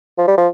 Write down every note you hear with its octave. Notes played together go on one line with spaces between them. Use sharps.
F3
G3
F3